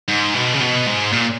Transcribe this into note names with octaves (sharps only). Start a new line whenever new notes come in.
G#2
B2
C#3
B2
G#2
A#2